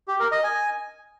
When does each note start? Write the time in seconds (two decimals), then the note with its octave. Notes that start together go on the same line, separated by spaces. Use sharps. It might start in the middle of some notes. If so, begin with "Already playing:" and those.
0.08 G4
0.20 A#4
0.32 D#5
0.44 G#5